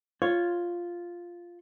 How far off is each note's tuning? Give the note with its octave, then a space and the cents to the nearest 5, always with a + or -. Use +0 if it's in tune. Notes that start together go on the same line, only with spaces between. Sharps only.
F4 +0 C#5 +0